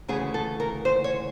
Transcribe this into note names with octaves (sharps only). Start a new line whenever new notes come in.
D2 C#3 E3 A3 G#4
A4
A#4
C5
C#5